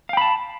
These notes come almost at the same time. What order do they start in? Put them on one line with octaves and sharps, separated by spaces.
F5 G5 B5 A5